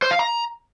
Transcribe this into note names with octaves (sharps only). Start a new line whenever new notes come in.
C5
F5
A#5